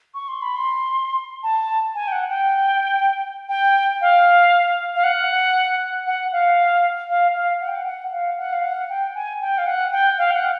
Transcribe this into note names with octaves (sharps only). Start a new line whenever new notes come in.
C#6
C6
B5
C6
A5
G#5
G5
F#5
G5
G5
F5
F5
F#5
F#5
F5
F5
F5
F#5
G5
F#5
F#5
F5
F#5
F5
F#5
G5
G#5
G5
F5
F#5
G5
F5
G5
F#5